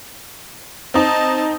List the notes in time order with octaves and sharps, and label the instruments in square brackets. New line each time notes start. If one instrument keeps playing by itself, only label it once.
[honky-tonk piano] C4 D#4 [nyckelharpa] D#5 A5